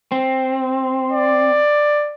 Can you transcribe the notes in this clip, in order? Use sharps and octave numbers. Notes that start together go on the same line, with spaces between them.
C4
D5